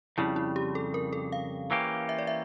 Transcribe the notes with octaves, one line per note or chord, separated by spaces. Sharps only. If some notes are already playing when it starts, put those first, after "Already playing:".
F2 C#3 G3 E4
E4
G4
A4
A#4
A4
F5
E3 A#3 C#4 G4
E5
D5
E5